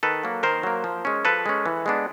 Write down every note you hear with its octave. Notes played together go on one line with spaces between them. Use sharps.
D#3 A4 B4
F#3 A#3
D#3 A#4 C5
F#3 A#3
F3
G#3 C#4
F3 A4 B4
G#3 C#4
E3
G#3 B3 D4